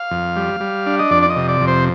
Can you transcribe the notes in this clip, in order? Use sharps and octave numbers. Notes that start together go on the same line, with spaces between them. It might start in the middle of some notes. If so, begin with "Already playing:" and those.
Already playing: F5
F2
G3
G3
D4
D#5
F2 D5
D5
D#5
C3
D5
F2
C5